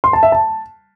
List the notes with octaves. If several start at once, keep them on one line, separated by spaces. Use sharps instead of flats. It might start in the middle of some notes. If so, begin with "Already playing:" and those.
C6
A5
E5
A5